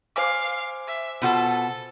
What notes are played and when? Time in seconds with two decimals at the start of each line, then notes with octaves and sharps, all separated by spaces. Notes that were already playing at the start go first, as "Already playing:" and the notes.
0.16 C5 F5 G#5 D6
0.87 E5
1.22 B2 F4 A4 F#5